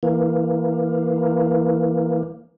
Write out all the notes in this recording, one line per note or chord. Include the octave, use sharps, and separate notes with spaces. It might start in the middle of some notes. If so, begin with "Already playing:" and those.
E3 A#3